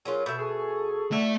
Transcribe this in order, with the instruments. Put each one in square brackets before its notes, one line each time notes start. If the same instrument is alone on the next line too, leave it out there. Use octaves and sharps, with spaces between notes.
[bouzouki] F#3 C#4 F4 [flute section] G#4 A#4
[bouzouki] B2 E5 [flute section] A4 B5 G6
[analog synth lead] G#4 [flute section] A4 C#6
[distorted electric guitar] A3 E5 [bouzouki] D4 E4 F#4